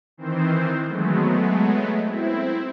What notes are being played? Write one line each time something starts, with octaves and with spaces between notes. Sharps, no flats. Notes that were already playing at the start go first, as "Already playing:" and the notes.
D#3 E3 C4 C5
F#3 G#3 A3 B3
C4 E4